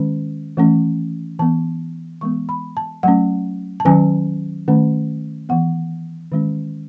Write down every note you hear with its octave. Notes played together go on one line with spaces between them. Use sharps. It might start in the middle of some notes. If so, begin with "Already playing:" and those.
Already playing: D#3 G#3 C#4
E3 A3 C#4
E3 B3 A5
E3 G#3 B3 C#6
B5
A5
F#3 A3 C#4 F#5
A5
D#3 F#3 C#4 G#5
D#3 A3 C#4
E3 B3 F#5
D#3 G#3 C#4